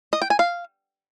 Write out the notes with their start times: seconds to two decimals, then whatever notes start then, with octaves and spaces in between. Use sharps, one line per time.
0.13 D#5
0.22 G5
0.30 G#5
0.39 F5